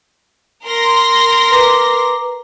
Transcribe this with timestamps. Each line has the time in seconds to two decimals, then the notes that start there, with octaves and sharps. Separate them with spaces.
0.64 A#4 C6 A#6
1.51 B4 A#5 D6